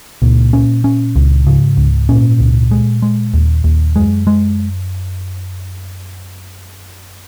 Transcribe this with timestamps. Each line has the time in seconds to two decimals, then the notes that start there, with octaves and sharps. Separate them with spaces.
0.22 C#2 A#2
0.53 C#4
0.84 C#4
1.16 C#2
1.47 G#2 C#3
1.77 C#2
2.09 A#2 C#4
2.40 C#2
2.71 G#3
3.02 G#3
3.34 D#2
3.64 D#2
3.96 F#2 G#3
4.27 G#3